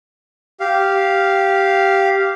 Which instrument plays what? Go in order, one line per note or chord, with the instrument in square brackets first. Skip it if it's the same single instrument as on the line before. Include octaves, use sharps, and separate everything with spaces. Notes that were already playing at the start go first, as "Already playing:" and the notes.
[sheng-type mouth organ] G4 F5